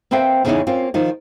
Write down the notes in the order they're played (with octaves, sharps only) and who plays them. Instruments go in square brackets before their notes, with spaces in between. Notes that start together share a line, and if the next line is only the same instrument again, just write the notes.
[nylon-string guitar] A#3 C4 B4 C5 E5 G5
E2 C#3 B3 C#4 D#4 E4
A#3 C4 C#4 F4
D#3 F3 D#4